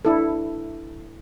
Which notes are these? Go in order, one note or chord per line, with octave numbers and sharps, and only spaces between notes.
D4 E4 A4